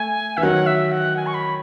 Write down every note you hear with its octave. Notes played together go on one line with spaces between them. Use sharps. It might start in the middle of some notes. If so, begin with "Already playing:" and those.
Already playing: A3 G#5
E3 E5
D#3 F#3 F#5
E5
F#5
G#5
C#6
B5